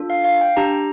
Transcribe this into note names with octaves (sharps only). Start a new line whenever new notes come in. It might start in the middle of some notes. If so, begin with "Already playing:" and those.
Already playing: D4 F4 A4
F5
F5
G5
D4 G4 A#5